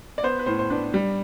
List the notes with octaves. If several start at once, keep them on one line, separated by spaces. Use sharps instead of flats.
D5
B3 C5
B4
A2 C5
C5
D4 B4
G3